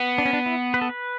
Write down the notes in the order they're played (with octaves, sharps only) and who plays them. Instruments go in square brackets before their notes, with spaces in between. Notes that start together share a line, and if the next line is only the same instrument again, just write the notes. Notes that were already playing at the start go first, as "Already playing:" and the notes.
Already playing: [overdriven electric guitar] B3
[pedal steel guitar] D4
C#4
D4
E4
B4
A4
B4